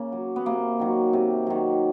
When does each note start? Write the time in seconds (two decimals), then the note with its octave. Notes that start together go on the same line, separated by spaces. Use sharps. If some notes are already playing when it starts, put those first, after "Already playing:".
Already playing: C#3 A#3
0.12 F#3
0.36 B3
0.46 C3 A#3
0.79 D#3 F#3
1.13 C3
1.47 D#3 F#3